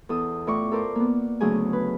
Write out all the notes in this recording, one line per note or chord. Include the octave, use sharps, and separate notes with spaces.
E2 A4 D#6
A2 F4 D5 C#6
A4 A#4 C5 D5
A#3 B3
D2 C#3 F#3 A3 G#4 G#5
B4